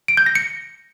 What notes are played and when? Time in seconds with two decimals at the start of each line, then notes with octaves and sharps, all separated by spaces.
0.08 D7
0.17 G6
0.26 A#6
0.35 C#7